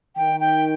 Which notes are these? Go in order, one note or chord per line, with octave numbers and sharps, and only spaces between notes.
D#3 G5
G5